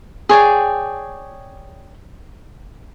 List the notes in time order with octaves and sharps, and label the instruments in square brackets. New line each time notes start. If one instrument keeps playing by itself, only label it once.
[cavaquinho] G#4 C#5 D5 G5